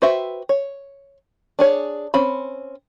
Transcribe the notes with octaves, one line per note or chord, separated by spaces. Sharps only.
F#4 B4 C5 E5 G5
C#5
D4 G#4 C#5
C4 C#4 B5